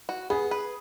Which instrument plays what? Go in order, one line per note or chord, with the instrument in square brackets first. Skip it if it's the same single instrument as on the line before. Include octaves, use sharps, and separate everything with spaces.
[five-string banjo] F#4
[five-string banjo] B3 [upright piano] G#4
[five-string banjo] B4